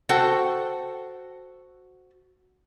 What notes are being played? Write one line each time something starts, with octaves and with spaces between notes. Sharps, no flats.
F#4 A4 C5 F#5 G5